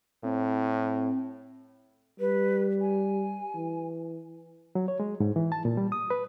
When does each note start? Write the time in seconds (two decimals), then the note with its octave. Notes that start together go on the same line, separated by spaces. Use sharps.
0.24 A2 C4
2.20 G3 B4
2.81 G#5
3.55 E3
4.75 F#3
4.88 C#5
5.00 G#3
5.20 G#2
5.36 E3
5.52 A5
5.65 A#2
5.77 G3
5.92 D#6
6.10 B4